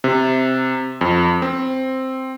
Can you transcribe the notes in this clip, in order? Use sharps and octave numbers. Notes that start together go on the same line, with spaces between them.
C3
F2
C4